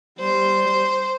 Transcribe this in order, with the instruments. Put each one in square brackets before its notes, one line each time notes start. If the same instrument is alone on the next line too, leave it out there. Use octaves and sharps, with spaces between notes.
[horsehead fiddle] G3 [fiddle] C5